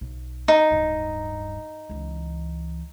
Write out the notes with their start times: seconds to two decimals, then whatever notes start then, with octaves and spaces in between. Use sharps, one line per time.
0.01 B1
0.48 D#4
0.71 D1 G2
1.90 C#2 E3